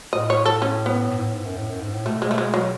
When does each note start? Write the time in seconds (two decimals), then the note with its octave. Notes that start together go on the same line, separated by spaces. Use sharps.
0.13 A2 D#5
0.30 C#5
0.46 A4
0.62 C#4
0.86 B3
1.10 A2
1.17 G#2
1.21 A2
1.34 G#2
1.45 F#2
1.57 A2
1.69 F#2
1.81 G#2
1.93 A2
2.05 B2 A3
2.22 G#3
2.31 A3
2.38 G#3
2.54 F#3